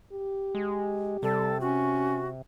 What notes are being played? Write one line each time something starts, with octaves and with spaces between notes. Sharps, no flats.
G4
G#3
C3 G3 A4
C#4 F#4